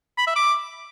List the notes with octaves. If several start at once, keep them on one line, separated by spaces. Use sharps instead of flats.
B5
E5
D6